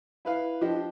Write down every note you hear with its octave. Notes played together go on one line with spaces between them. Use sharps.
E4 B4 F5
F3 D4 G4 D#5